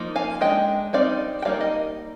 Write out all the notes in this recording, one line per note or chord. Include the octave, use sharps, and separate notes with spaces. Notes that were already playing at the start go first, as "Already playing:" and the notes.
Already playing: F3 A#3 D#4
F5 G#5
G#3 D4 D#5 G5
G3 C4 D#4 D5 F5
G5
G3 A#3 D#4 D5 F5
D#5